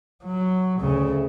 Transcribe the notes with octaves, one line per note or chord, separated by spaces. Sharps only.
F#3
D2 C#3